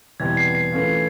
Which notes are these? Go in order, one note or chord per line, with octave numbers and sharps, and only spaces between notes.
E2 B2 G3 C4 E4 G#6
C7
C7
E3 A3 C#4 F4